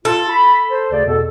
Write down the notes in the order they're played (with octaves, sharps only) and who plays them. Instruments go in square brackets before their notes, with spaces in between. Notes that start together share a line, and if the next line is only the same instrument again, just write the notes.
[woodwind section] F4 [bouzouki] A4
[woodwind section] B5
C5
D2 C#3 D5
E2 B2 A4